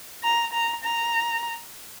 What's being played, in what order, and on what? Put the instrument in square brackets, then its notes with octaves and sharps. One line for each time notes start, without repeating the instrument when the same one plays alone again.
[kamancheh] A#5
A#5
A#5